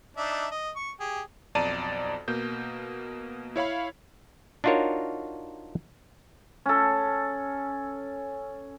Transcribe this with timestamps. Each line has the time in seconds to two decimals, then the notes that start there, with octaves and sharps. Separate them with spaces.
0.17 D4 D#4 E5
0.51 D#5
0.75 C#6
1.00 G4 G#4
1.55 B1 F2 D5 A5 A#5 D#7
2.28 B2 A#3 G6
3.56 E4 C#5 F5 B5
4.64 D4 D#4 F4 F#4 A#4 C#5
6.66 C#4 A4